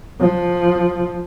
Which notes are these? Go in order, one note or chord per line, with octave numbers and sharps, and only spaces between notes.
F3